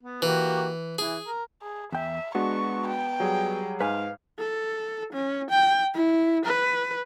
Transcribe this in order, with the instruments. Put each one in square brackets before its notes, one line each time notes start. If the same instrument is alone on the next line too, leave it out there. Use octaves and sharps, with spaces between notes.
[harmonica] B3
[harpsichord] E3 [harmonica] A#3 F#4 G4
[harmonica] E3 [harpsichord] G#4
[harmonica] A#4
[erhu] G#4
[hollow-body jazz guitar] E2 G5 [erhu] E5
[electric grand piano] G#3 D4 F#4 [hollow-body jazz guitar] B3 [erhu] C#6
[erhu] G5
[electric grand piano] F#3 G3 G#4
[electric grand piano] G#2 [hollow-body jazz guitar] B4 G#5 [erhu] F5
[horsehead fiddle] A4
C#4
G5
E4
B4